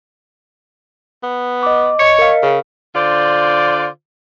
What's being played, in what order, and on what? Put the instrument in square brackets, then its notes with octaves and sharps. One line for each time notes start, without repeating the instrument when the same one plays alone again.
[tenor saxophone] B3
[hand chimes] D#5 D6
[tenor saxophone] C#5 [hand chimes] D#5 C#7
[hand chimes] A#4 F5
[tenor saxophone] C#3
[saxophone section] D3 F4 C5 D5